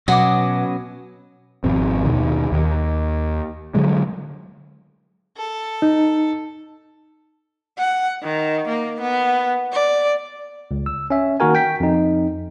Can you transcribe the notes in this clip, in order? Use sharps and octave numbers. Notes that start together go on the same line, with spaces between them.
B2 F#3 B3 C#4 D#5 F#5 D6
G#1 F2 B2 C4
D#2 B2 D#3
D#2
D3 F#3 G#3
A4
D#4
F#5
D#3
A#3
B3
D5
C#2
E6
C#4 E5
D#3 A#3 F#4 A#4 G#5
G5 B6
F2 D#4